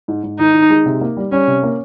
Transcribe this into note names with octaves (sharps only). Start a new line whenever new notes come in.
G#2
G#2
D#3 D#4
D#3
G#3
C3
A#3
G3
G3 C#4
C3
A#3